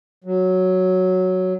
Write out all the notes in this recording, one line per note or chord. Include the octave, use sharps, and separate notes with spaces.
F#3